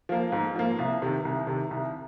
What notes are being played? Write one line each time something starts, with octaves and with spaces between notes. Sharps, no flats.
F3 A#3
G#2
F3 A#3
C2
C3 D#3
C2
C3 D#3
C2